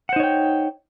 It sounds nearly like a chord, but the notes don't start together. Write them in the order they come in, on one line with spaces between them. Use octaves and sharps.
F#5 C5 D#4 C#5 G5